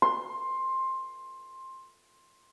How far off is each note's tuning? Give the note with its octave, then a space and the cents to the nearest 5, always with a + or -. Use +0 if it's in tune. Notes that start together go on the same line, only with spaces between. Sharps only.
C6 +15